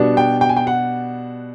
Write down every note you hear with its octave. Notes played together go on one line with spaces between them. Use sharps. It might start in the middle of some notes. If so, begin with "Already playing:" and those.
Already playing: B2 G3 B3 D4
G5
G5
G#5
G5
F#5